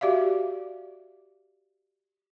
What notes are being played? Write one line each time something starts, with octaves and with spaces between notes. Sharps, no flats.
F#4 G4 D5 E5 F5